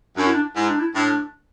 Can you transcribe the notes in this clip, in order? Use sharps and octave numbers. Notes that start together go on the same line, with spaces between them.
F#2 D4
E4
D4
G#2 E4
D4
E4
A2 D4